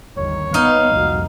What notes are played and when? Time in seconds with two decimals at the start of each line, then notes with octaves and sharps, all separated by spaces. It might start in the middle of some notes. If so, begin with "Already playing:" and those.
0.17 G1 D#2 D#3 C#5
0.54 B3 D#4 F5
0.92 C2 F2 A#2 F#4